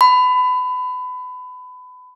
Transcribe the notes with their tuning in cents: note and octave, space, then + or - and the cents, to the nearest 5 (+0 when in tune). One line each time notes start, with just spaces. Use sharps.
B5 +25